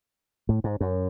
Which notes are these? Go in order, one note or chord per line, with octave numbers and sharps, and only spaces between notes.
A2
G#2
F#2